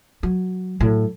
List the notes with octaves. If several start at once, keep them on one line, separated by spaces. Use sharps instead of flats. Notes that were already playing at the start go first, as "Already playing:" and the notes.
F#3
A2 F#3